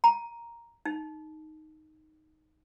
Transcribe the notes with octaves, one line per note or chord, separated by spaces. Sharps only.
A#5
D#4